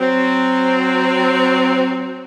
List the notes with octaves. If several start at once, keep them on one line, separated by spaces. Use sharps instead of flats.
F#3 C4